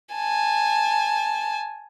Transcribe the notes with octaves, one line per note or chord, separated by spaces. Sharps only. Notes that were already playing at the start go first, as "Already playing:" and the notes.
G#5 A5